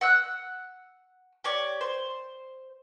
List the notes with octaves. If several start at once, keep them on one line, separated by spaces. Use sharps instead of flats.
F#5 E6 F#6
G4 C#5 D5
C5